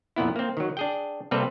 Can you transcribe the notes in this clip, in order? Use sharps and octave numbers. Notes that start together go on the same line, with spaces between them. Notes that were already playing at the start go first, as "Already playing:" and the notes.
F2 A#2 B3 E4
A#3 C4
D#3 F#3
D4 G#4 G5
C3 G3 A#3 C4 A4 B4